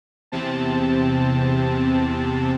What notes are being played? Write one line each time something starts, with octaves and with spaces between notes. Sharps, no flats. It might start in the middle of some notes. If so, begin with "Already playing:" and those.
E2 C3 C4 A5